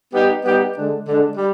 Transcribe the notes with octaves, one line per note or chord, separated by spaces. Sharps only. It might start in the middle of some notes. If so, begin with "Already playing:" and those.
G3 B3 D#4 G4
G3 B3 D#4 G4
D3 G#3 D4
D3 G#3 D4
G3